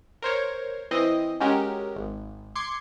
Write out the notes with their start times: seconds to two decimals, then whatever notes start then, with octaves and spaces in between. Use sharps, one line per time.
0.22 A#4 C5 C#5
0.91 E3 C4 D#5
1.40 G#3 C#4 F#4 G4 A#4
1.96 G#1
2.55 C6 D6 G#6 C7 C#7